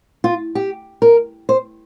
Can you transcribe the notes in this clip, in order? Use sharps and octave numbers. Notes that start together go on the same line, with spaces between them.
F4
G4
A#4
C5